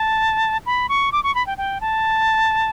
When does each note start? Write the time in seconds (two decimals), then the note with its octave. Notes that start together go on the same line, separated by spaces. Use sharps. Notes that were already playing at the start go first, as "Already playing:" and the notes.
Already playing: A5
0.66 B5
0.89 C#6
1.12 D6
1.23 C#6
1.35 B5
1.46 G5
1.58 G5
1.81 A5